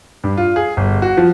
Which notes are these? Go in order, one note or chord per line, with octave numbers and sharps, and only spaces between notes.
G2
F4
G#4
G1
F#4
F3